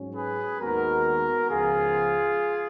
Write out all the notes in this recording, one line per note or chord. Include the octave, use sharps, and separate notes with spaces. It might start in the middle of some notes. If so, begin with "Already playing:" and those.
Already playing: G#2 F#3 C#4
G#4 B4
D#2 D#3 G#3 B3 F#4 A#4
C#2 C#3 F3 B3 F4 G#4